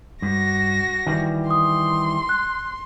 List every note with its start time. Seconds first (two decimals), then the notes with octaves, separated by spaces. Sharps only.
0.22 G2 F#4 A#6
1.07 D#3 E3 G3
1.50 C6 D#6
2.29 F#6